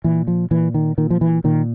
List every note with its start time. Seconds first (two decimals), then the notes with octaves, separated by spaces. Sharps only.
0.04 A#2 E3
0.28 F3
0.51 A#2 E3
0.74 D#3
0.98 A#2 D#3
1.10 F3
1.21 E3
1.44 A#2 D#3